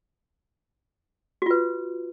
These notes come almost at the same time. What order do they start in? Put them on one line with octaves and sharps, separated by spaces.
F#4 F4 B4